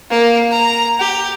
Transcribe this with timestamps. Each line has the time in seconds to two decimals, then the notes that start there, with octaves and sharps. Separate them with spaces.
0.10 A#3
0.51 A#5
0.99 G4